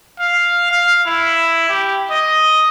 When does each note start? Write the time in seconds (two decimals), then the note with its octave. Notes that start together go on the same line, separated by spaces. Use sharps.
0.20 F5
0.71 F5
1.06 E4
1.69 G4
2.11 D#5